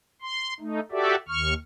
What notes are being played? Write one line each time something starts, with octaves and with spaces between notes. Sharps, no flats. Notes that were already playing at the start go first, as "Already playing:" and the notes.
C6
A3 D#4
F#4 G4 A4 D5 E5
D#2 C#6 F6